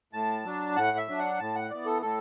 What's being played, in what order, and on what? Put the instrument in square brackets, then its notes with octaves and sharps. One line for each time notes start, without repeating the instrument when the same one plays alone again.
[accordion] A2 A5
F#3 D4
A2 F#5
E5
F#3 D4
F#5
A2 A5
F#5
E3 B3 D5
A4
A2 A4